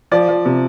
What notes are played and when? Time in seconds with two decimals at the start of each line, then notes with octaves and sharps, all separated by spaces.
0.12 F3 D5
0.28 F3
0.45 C3